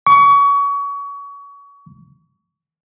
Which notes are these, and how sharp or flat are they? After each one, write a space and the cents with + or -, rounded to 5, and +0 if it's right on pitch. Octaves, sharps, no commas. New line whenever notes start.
C#6 +30